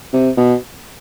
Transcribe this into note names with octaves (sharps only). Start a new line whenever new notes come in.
C3
B2